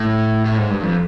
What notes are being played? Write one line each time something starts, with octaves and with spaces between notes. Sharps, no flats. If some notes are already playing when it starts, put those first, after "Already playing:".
Already playing: A2
A2
G#2
G2
F2